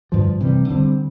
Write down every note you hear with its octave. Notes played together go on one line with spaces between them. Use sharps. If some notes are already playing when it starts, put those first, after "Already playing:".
G2 D3 F3
C3 E3 G3
D3 G3 C4